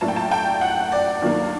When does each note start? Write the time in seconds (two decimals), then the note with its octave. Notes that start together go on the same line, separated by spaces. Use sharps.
0.01 A2 F#3 A#3 D4 A5
0.08 G5
0.16 A5
0.31 G5
0.61 F#5
0.92 D5
1.22 G2 D#3 F#3 A#3